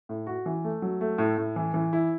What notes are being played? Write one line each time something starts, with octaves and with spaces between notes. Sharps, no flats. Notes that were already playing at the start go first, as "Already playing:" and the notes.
A2
F#4
E3
A3
F#3
A3
A2
A2
E3
E3
E4